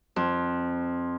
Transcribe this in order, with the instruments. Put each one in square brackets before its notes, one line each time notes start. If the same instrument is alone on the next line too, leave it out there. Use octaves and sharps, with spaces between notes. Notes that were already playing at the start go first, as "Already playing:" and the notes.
[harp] F2